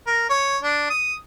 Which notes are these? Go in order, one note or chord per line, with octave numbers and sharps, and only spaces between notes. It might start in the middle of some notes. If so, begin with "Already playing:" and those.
A#4
C#5
D4
D#6